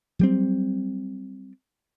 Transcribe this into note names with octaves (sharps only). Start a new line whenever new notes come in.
F#3 G3 C4